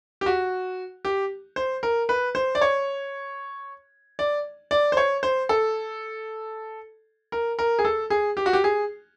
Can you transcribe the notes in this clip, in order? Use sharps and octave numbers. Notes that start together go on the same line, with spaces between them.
G4
F#4
G4
C5
A#4
B4
C5
D5
C#5
D5
D5
C5
C#5
C5
A4
A#4
A#4
G#4
A4
G#4
G4
F#4
G4
G#4